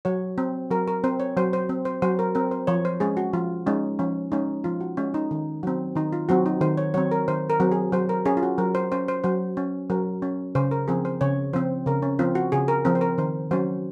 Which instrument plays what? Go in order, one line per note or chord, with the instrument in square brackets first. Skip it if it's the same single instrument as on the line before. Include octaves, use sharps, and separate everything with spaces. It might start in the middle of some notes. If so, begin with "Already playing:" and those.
[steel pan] F#3 C#5
C4
F#3 A#4
A#4
C4 C5
C#5
F#3 C5
C5
C4
C5
F#3 C5
A#4
C4 A#4
C5
F3 C#5
C5
G#3 C#4 G#4
F#4
F3 F4
G#3 C#4 D#4
F3 C#4
G#3 C#4 D#4
F3 F4
F#4
G#3 C#4
D#4
D#3
F#3 C4
D#3 D#4
F4
F#3 C4 F#4
D#4
D#3 C5
C#5
F#3 C4 C#5
A#4
D#3 C5
A#4
F#3 C4
G#4
F#3 C5
A#4
C#4 G#4
F4
F#4
F#3 A#4
C5
C#4 C5
C5
F#3 C5
C#4
F#3 A#4
C#4
C#3 C5
A#4
F3 C4 G#4
C5
C#3 C#5
F3 C4 C5
C#3 A#4
C#4
F3 C4 F4
F#4
C#3 G#4
A#4
F3 C4 A#4
C5
A#4
D#3 C5
F#3 C#4 C5